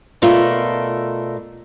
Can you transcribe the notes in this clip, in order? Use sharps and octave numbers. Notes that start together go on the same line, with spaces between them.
B2 A3 F4 A4 A#4 D5